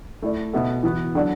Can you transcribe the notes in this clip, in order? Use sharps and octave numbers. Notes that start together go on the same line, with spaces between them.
A3 E4 A4 D5
B2 B3 F#4 A4 E5
E3 B3 F#4 B4
D3 F#3 D4 F#4 D5